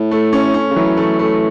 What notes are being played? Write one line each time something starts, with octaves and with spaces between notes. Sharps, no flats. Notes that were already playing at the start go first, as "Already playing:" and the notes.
Already playing: A2
A3
C#4
C#4
C#3
E3 F#3
A3
A3